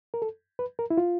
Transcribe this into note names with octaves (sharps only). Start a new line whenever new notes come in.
A#4
A4
B4
A#4
E4
F4